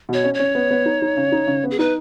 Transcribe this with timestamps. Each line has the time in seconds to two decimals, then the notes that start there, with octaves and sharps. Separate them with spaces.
0.09 B2 C#5
0.24 C#4
0.34 C#5
0.39 C#4
0.55 B3
0.71 B3
0.86 D#4
1.02 D#4
1.17 C#3
1.32 D#4
1.47 C#3
1.64 B3
1.71 G#4
1.79 D#4 B4